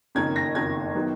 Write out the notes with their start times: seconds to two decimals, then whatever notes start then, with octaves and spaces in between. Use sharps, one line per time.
0.15 F#1 F2 D#3 A#3 C#4 G#6
0.36 A#6
0.55 F#1 F2 D#3 A#3 C#4 G#6
0.95 D#3 F#3 B3